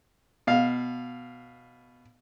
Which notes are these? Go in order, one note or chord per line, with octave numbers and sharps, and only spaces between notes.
B2 F5